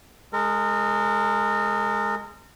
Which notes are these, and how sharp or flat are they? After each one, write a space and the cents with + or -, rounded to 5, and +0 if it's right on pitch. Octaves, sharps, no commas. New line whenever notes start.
G#3 +0 A#4 -35